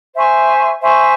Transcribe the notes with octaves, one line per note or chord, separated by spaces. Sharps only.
C5 E5 G#5 C#6
C5 E5 G#5 C#6